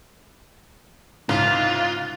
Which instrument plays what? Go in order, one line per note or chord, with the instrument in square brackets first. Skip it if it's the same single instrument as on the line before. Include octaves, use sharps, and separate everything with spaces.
[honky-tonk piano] C2 G#2 C#3 [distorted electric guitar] F4